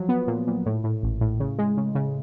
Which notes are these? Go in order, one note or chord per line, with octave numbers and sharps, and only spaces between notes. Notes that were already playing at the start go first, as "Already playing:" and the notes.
Already playing: F3 F#3
B3
A#2
A#2
A2
A2
A1
A2
C#3
G#3
C#3
C#3